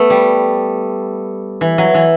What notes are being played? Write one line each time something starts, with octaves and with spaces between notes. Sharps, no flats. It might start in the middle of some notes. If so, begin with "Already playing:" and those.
Already playing: A3 B3
G3
E3
F#3
E3